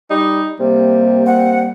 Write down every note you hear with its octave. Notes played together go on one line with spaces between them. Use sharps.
G3 D#4
C3 G3 A#3
C4 F#5